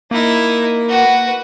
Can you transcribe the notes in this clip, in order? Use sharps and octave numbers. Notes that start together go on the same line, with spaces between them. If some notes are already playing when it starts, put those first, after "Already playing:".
A#3 D#4 E4
F#4 B4